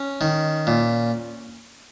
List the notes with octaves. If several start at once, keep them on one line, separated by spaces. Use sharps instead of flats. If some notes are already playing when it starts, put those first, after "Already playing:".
Already playing: C#4
D#3
A#2